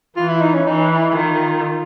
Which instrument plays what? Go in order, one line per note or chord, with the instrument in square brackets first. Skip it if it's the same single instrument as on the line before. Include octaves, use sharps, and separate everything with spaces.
[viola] E3 [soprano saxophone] F4
[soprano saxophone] E4
D#4
C#4
[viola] E3 [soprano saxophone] D#4
[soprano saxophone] E4
E4
[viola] D#3 [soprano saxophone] F4